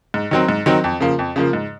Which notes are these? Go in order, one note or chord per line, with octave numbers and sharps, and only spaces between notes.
G#2
D#3 F#3 C4
G#2
D#3 F#3 C4
F2
C#3 F3 A#3
F2
C#3 F3 A#3
G#2